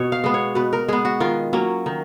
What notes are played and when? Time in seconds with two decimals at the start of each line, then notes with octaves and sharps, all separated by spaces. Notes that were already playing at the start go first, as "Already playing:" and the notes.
Already playing: B2 C#5
0.12 F5
0.24 G#3 B3
0.34 C#5
0.55 B2 B4
0.73 A#4
0.88 G#3 B3 G#4
1.05 F#4
1.20 D#3 F4
1.53 F#3 A#3 C#4
1.86 D#3